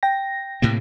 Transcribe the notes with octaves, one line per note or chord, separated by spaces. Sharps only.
G5 A#6
A2 C3 A#3